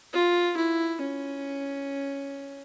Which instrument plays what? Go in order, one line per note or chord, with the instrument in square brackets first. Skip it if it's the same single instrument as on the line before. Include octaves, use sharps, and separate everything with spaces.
[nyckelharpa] F4
E4
C#4